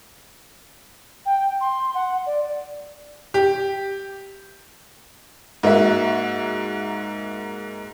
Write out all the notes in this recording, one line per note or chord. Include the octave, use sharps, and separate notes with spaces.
G5
C6
F#5
D5
G4
G#2 A#3 F#4 E5